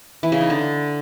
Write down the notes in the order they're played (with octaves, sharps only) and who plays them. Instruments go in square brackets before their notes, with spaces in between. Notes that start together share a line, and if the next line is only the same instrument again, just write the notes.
[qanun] E3
C#3
D#4
D3